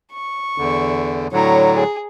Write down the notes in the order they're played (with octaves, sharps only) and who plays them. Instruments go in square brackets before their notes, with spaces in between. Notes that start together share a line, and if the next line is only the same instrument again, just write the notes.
[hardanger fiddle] C#6
[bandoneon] E2 D3
[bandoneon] A2 D3 F#3 [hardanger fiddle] C#5 A#5
[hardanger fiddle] G#4